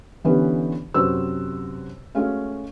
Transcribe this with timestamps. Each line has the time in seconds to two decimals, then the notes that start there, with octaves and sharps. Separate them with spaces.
0.24 D3 E3 B3 C#4 G4 B4
0.94 F#2 C3 F#4 B4 C5 E6
2.15 G#3 A3 C#4 F#4 F5